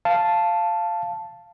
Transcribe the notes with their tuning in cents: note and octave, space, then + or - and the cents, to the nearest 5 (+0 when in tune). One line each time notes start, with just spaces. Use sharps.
F5 -10 A5 +0